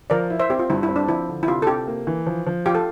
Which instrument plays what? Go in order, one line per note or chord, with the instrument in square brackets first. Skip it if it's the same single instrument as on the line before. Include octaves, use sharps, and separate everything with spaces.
[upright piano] F3 [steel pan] A#4 D5
[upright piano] E4
[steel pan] C5 E5
[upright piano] C4 [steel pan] G4
[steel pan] F4
[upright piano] G2 [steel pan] E4
[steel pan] E4
[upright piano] C4
[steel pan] D4
[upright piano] F3 [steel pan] E4
[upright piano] D3
[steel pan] E4
[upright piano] C3 [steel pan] F4
[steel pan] A4
[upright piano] C3 [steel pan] G4
[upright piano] A#3
E3
F3
F3
[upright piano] F4 [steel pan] G4
[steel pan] A4